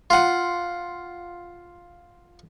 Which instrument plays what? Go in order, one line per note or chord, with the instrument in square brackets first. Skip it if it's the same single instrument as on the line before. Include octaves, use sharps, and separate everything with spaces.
[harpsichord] F4 F#5